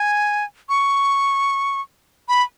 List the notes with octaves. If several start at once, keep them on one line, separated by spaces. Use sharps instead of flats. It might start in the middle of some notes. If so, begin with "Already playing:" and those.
Already playing: G#5
C#6
B5